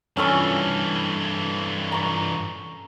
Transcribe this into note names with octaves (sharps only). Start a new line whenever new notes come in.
G2 E3 C#4 A4 C#6
A#5 C#6